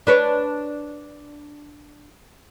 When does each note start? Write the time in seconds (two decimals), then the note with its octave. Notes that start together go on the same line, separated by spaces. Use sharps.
0.07 D4 B4 C#5